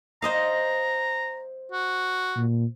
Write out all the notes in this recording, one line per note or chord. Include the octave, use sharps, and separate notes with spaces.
C5 D#5 F5 A#5
F#4
A#2